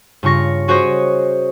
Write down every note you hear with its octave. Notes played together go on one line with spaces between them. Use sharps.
G2 C#3 F4 C#6 A#6
C#4 F#4 G#4 C5 C#5 D#5